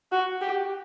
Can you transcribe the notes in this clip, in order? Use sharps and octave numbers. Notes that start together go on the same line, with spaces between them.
F#4
G4